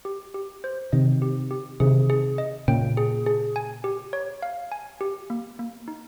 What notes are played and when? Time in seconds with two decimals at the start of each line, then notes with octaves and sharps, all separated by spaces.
0.05 G4
0.34 G4
0.64 C5
0.92 C3 D#3 D#5
1.22 G4
1.51 G4
1.80 C3 D#3 G#4
2.10 G#4
2.38 D#5
2.68 A#2 C#3 G5
2.97 G#4
3.26 G#4
3.56 G#5
3.84 G4
4.13 C#5
4.42 F5
4.72 G#5
5.01 G4
5.30 A#3
5.59 A#3
5.88 D#4